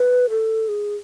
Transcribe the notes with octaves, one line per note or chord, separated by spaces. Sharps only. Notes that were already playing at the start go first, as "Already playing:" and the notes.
Already playing: B4
A4
G#4